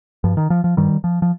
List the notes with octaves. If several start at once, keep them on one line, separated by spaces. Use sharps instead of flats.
G2 F3
D#3
F3
F3
G2 D#3 G3
F3
F3